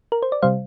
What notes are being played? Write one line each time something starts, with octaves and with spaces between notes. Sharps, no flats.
A#4
C5
D5
C3 G3 C5 F5